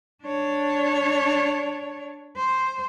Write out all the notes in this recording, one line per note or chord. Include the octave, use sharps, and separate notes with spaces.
D4 C#5
C5